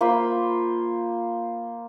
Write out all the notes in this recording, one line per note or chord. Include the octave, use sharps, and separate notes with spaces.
A#3 F4 C5 B5